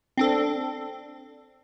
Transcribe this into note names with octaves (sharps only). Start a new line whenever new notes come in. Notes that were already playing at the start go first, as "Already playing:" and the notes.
C4 D4 A4